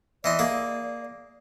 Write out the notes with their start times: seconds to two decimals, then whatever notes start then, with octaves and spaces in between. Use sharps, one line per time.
0.24 E3 D5 D#5 C6
0.39 A#3 G#4